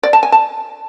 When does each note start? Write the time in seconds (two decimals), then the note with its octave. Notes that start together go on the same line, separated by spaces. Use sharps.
0.03 D5
0.13 A5
0.23 G#5
0.32 A5